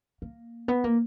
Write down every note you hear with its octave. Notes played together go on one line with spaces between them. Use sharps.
A#3
B3
A#3